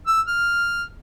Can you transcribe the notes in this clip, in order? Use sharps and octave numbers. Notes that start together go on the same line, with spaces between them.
E6
F6